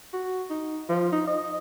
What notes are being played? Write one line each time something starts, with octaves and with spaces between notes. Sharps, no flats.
F#4
D#4
F3
D#4
D#5